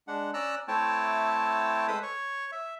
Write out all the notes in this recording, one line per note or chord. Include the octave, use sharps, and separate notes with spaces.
G#3 D4 F#5
C#4 D5 A#5 E6 F#6
A3 C4 E4 C#5 G5 A5
G#3 A4 B4 C5 B5 D#6
C#5 C#6
E5